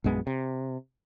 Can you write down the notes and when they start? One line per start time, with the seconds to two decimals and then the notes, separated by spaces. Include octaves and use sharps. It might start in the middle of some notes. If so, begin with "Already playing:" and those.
0.04 A#1 F#2 G#3 B3
0.27 C3